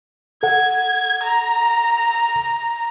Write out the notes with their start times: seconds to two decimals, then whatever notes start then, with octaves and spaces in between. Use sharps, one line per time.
0.43 A4 F#5 G#6
1.23 A#5